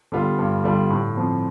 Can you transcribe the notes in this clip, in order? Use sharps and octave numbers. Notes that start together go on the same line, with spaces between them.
D3 G3 B3 F4
G2
D3 G3 B3 F4
A2
F3 C4